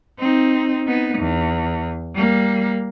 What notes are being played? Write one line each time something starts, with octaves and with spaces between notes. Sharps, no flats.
C4 D#4
B3 D#4
E2
G3 A#3